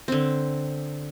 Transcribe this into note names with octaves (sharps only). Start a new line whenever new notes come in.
D3 C4